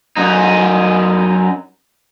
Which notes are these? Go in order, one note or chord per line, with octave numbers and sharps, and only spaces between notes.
F#2 D#4